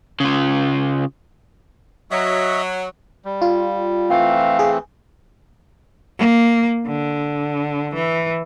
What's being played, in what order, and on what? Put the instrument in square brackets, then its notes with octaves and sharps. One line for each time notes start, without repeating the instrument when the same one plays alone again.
[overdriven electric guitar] C#3 F4
[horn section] F#3 [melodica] D#5 E5
[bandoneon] G3
[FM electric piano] F4
[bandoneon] E3 A3 C4 [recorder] F5
[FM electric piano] G#4
[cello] A#3
D3
E3